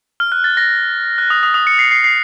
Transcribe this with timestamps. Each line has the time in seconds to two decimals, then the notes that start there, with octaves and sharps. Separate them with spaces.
0.20 F6
0.32 F#6
0.44 A6
0.57 A#6
1.18 F#6
1.30 D#6
1.43 D#6
1.54 D#6
1.67 C#7
1.79 C7
1.91 C7
2.04 C7